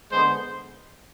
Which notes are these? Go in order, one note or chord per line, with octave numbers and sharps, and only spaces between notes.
D3 G#3 B3 C5